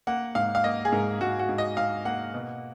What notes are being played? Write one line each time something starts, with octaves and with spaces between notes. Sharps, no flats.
A#3 F#5
G#2 F5
F5
A#3 D#5
G#4
G#2 A#4
G#2 F#4
F#4
G#2
D#5
G#2 F5
A#3 F#5
B2